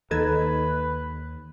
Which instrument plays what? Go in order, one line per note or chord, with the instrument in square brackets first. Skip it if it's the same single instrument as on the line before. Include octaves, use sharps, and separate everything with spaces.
[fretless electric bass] D#2 [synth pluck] D#3 A4 G#6 [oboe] B4